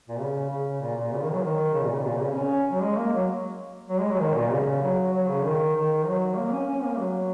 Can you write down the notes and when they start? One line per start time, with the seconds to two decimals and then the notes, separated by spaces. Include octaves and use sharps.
0.09 A#2
0.19 C#3
0.50 C#3
0.81 A#2
0.97 A#2
1.12 C#3
1.22 D#3
1.32 F#3
1.43 D#3
1.73 C#3
1.83 A#2
1.92 C#3
2.05 A#2
2.20 C#3
2.35 C#4
2.71 F#3
2.82 G#3
2.97 A#3
3.13 F#3
3.90 F#3
4.00 G#3
4.11 F#3
4.21 D#3
4.36 A#2
4.52 C#3
4.83 F#3
5.13 F#3
5.28 C#3
5.44 D#3
5.76 D#3
6.07 F#3
6.37 A#3
6.52 C#4
6.67 C#4
6.84 A#3
6.99 F#3